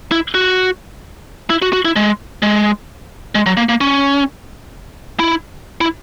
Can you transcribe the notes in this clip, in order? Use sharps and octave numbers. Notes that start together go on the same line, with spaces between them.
E4
F#4
E4
F#4
F#4
E4
G#3
G#3
G#3
F#3
A#3
A#3
C#4
E4
E4